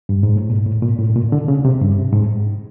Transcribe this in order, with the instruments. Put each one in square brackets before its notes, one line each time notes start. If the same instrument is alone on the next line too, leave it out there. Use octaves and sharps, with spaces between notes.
[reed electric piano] G2
G#2
A2
A#2
A2
A#2
A2
A2
A#2
D3
C#3
C3
G2
G#2